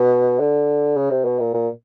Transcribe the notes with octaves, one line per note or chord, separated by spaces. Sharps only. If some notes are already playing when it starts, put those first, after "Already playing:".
Already playing: B2
D3
C#3
C3
B2
A#2
A#2